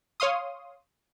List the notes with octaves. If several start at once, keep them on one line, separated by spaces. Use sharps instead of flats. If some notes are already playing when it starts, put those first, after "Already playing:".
C#5 F5 C6 D#6